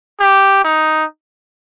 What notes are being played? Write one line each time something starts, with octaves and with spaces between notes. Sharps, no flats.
G4
D#4